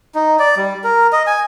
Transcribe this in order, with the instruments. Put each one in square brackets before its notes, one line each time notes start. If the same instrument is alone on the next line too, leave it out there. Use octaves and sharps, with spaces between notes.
[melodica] D#4
D5
G3
A#4
D#5
G#5